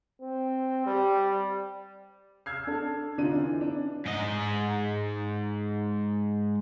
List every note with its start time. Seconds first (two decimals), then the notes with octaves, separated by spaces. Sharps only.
0.21 C4
0.86 G3
2.46 E6 F6 G#6 C7
2.67 D4 A4 A5
3.18 D3 D4 D#4 F4 D#7
3.37 E3
3.61 D4
4.06 G#2 D#5